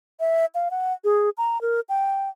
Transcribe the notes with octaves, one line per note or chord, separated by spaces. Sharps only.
E5
F5
F#5
G#4
A#5
A#4
G5